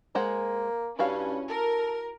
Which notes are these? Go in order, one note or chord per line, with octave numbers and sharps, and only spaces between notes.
G#3 A#3 C5 F#5
G2 C#4 E4 F#4 F5
A4 A#4